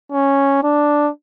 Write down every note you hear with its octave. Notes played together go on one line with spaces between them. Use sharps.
C#4
D4